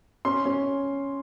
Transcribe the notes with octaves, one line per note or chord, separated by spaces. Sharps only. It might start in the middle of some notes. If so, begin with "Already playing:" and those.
C#4 C6
C#4